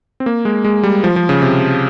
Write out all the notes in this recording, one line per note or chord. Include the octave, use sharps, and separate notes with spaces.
C4
A#3
G#3
G#3
G3
F3
F3
C#3
C3